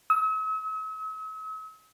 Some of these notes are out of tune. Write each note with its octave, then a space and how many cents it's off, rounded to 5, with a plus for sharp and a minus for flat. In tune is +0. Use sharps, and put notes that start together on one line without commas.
E6 -45